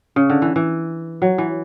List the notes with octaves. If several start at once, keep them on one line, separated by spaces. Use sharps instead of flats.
C#3
D3
E3
E3
F#3
E3